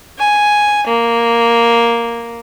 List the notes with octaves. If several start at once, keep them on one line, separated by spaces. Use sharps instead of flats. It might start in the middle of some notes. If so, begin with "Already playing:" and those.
G#5
A#3